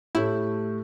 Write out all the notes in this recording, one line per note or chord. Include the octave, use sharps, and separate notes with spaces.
A2 A3 E4 G4 C#6 G6